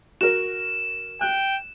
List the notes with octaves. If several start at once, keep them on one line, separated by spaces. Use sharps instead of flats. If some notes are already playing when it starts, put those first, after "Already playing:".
F#4 A#4 E7
G5 F#6